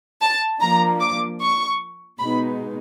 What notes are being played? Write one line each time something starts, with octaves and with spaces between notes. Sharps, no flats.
A5
F3 A#3 D4 A#5
D6
C#6
B2 G#3 B3 D#4 B5